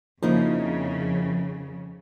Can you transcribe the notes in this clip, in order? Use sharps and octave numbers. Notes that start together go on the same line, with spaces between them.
F2 C#3 F3 A#3 D#4 E4